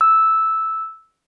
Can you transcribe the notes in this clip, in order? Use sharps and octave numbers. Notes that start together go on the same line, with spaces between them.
E6